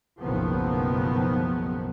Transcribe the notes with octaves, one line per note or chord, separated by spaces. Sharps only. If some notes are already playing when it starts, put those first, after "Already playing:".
F#1 B1 A2 D#3 F3 B3